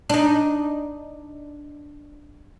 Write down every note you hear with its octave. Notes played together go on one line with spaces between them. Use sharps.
D4 D#4